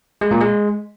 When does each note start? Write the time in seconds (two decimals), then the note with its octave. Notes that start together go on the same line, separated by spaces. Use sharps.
0.21 G#3
0.31 A#2
0.41 G#3